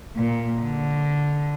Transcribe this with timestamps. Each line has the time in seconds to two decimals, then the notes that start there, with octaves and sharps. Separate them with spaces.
0.16 A#2
0.62 D3